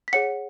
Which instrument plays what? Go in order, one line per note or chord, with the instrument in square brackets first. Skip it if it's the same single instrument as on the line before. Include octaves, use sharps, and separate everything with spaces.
[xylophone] B6
G#4 C#5 F#5 C#7